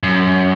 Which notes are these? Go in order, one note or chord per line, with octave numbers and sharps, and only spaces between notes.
F#2